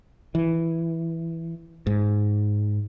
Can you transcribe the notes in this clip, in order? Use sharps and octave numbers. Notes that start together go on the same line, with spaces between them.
E3
G#2